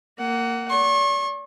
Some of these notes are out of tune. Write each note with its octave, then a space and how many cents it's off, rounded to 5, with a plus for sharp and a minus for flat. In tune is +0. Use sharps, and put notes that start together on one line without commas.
A#3 -15 F#5 +20
D5 -40 C#6 -40